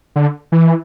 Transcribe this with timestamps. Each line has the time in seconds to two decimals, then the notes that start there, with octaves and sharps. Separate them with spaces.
0.16 D3
0.52 E3